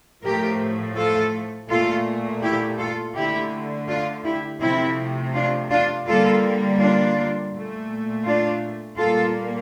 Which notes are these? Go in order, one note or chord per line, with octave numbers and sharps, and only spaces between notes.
A2 F3 A3 G4 A#4
F4 A4
A#2 A3 F4 A4
E4 G4
F4 A4
D3 A3 E4 G4
D4 F4
E4 G4
C3 F3 A3 C4 E4
D4 F4
D4 F4
D3 G3 A#3 F4 A4
D4 F4
A#2 A3
D4 F4
A#2 G3 A#3 F4 A4